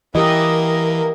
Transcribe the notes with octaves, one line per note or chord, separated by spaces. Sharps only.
E3 A#3 G4 A#4 D#5